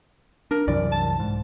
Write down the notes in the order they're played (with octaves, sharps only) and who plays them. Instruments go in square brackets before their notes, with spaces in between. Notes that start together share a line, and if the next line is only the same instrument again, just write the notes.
[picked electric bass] D4 [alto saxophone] A#4
[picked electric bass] C2 F#2 E3 [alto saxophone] D5
[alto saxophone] A5
[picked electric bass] G#2